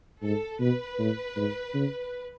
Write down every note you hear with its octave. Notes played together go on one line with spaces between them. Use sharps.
G#2 A4
B2 B4
A2
G#2
C#3